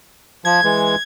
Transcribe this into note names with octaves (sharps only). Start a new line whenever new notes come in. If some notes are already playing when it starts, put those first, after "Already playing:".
F3 G#6
E3 G#3